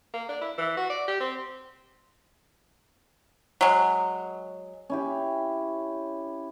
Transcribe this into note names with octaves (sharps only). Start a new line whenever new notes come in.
A#3
D4
E4
E3
F#4
D5
G4
C4
F#3 G#3
C#4 E4 G4